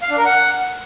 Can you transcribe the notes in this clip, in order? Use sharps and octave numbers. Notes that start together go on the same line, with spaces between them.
F5
D4
A#4
F#5